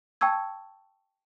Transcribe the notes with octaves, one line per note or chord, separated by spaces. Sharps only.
G5 A5 C#6 E6 G#6